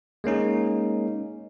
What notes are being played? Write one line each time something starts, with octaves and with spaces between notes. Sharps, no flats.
G#3 A#3 C#4 D#4